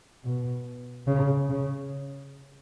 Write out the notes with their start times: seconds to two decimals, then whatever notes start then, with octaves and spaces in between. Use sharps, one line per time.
0.24 B2
1.07 C#3
1.50 C#3